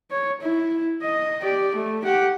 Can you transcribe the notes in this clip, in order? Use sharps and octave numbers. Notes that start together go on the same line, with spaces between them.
C#5
E4
D#5
G4 D5
A3
G4 F#5